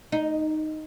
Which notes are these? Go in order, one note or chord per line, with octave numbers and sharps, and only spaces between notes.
D#4